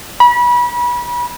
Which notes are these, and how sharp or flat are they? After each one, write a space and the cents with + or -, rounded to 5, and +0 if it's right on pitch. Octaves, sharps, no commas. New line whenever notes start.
B5 -30